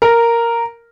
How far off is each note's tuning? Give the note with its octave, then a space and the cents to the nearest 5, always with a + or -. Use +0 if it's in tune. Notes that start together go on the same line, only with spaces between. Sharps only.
A#4 -5